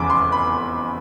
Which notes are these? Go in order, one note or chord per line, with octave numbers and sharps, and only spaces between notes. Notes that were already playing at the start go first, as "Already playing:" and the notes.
Already playing: F1 E2 C#3 D6
C6
B5